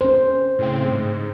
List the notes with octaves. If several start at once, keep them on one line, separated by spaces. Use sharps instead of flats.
C#4 C5
A2 C#3 C4
G#2